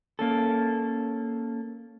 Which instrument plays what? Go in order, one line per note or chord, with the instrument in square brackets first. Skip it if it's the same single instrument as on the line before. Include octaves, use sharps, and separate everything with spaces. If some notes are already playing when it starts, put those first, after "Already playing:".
[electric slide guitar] A#3 C#4 A4